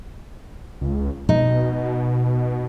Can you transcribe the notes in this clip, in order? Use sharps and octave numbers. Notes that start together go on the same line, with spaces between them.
C#2
B2 D#4